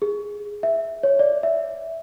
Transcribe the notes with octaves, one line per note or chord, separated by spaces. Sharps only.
G#4
E5
C#5
D5
E5